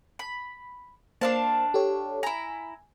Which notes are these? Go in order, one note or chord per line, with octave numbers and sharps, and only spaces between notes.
B5
A#3 D4 C5 F5 A5
G4 A4 C#5
E4 G#5 A#5